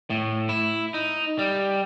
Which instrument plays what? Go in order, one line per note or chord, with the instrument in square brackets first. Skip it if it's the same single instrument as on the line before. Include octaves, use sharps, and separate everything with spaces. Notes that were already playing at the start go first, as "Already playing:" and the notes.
[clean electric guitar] A2
E4
D#4
G3